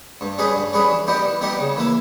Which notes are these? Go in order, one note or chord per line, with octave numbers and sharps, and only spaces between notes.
G2
G3 C#4 G#4 B4
G2
G3 C#4 G#4 B4
E3
G3 B3 D#4 G4
E3
G3 B3 D#4 G4
C#3
E3 A#3 E4